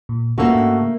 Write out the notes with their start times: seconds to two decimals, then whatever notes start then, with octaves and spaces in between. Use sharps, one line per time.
0.09 A#2
0.38 C#3 A3 A#3 F4 F#4 A4 B4
0.55 G#2 D4 G5